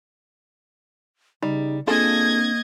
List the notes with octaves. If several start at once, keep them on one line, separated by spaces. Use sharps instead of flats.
C#3 G3 D#4
A#3 C4 D4 F4 G#4 A4 D#5 G#6